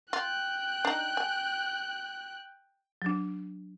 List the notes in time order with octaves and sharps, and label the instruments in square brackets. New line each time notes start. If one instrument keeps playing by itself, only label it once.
[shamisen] F4 [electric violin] G5 F#6
[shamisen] D4 D#4
G#5
[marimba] F#3 D4